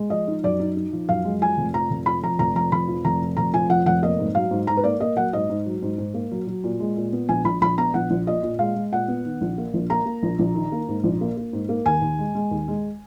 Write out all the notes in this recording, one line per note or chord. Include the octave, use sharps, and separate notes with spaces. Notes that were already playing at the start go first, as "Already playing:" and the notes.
Already playing: G#3
F3 D#5
D#4
F#2 D5
D#4
D#4
F3
F#2 F5
G#3
F3 G#5
F1
F3 A#5
F1
F3 B5
F2 A#5
F1 A#5
F2 A#5
F1 B5
F3
F1 A#5
F3
F1 A#5
F3 G#5
F2 F#5
F1 F#5
A#3 D#5
G#2
F#3 F5
G#2
G#2 A#5
B4
A#3 D5
A#3 D#5
F#3 F#5
G#2 D#5
G#2
F#3
G#2
G#2
A#3
F#3
F#3
A#2
G#3
A#2
B3
A#1 G#5
A#1 B5
A#1 B5
B3 A#5
A#1 F#5
A#1
A#2 D#5
A#2
G#3 F5
G#3
A#2 F#5
B3
D#3
A#1
A#3
A#1
A#3 A#5
A#3
A#1
A#1
D#3
A#3
G#2
A#1
A#3
A#3
G#2
A#3
D#2 G#5
D#2
G#3
G#3
D#2
G#3